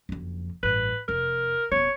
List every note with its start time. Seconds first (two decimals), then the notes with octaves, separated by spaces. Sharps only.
0.09 F#1 F2
0.63 A1 G2 B4
1.09 F1 A#4
1.72 D#1 B3 C#5